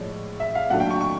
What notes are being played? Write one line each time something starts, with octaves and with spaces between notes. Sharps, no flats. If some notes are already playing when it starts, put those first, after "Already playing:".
Already playing: A2 F3 G#3 F4 C#5 D5
E5
F5
A#2 F#3 A3 D4 F#5
G5
C#6
C#6